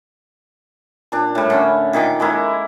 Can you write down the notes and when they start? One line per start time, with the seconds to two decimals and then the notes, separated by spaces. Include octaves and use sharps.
1.12 A#2 D4
1.35 A2 G3
1.50 D3 C#4
1.93 A#2 D#3 D#5 D6
2.20 G#3 A#3 E4